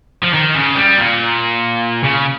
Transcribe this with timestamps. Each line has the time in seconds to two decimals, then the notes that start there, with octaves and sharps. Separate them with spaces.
0.23 F3
0.33 D#3
0.55 C#3
0.76 G3
0.97 A#2
2.04 C#3